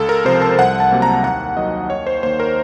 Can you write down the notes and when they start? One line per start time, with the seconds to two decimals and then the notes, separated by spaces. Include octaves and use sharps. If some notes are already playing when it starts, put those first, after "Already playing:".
Already playing: C#2 A4
0.09 A#4
0.25 C3 F3 C5
0.42 A5
0.59 C2 F#5
0.80 A5
0.92 C3 F#3 A#3
1.02 A#5
1.24 D#2 F#5
1.57 D#3 F#3 D#5
1.90 D#2 C#5
2.07 C5
2.23 D#3 A#3 C5
2.40 A#4